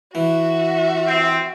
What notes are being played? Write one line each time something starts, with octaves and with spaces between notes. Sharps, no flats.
E3 F#4 E5
C4